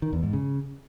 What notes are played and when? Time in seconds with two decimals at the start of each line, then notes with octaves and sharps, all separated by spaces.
0.02 D#3
0.13 E2
0.23 G#2
0.33 C#3